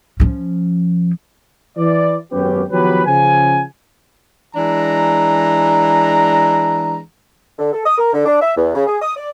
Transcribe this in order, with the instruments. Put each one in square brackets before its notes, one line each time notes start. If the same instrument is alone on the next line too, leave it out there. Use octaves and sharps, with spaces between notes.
[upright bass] F3 C#4
[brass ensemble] E3 D5
G#1 F#2 B3 C#4 G4
D#3 F3 F#3 B3 G4 B4
C#3 F3 G#5
[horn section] E3 G#3 D4 A#5
[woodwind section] D3
A4
D#6
A#4
D3
D4
E5
E2
C#3
G#4
D#6
D5